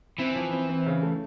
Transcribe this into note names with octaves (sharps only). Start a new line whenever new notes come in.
E3 C4
F3
C4
C4
C#3
A3